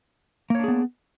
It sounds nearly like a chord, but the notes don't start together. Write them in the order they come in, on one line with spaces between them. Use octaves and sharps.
A#3 C#5 D4 G#4 B3